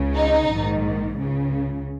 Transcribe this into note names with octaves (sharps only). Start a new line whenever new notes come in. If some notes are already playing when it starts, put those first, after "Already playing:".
Already playing: C#2 C#3
D#4
A#1 G#2 D#3
C#2 C#3